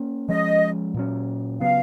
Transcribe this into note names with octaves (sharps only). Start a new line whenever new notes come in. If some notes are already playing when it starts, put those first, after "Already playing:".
Already playing: A#3 C#4
F3 G#3 C#4 D#5
A#2 F#3 C#4
C#3 F#3 B3 F5